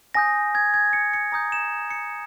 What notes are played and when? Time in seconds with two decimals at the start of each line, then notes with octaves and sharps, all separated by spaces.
0.14 G#5 D#6 G6 A#6
0.55 G#6
0.74 G#6
0.93 C#7
1.13 C#7
1.32 A#5 D#6 G6 A#6
1.52 E7
1.91 C#7